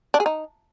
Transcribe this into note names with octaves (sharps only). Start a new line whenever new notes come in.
D4
G#4
D#4